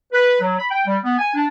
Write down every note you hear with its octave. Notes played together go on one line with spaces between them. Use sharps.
B4
F#3
B5
G5
G3
B3
G#5
D4